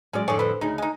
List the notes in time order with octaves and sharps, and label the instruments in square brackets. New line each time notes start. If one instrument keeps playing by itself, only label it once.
[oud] F#3 G#3 D5 [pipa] C#4
[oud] F2 A2 D3 [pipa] G#4 C#5 D5
[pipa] B4 C5
[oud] D2 C#3 [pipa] D#4
[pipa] G#3 D#4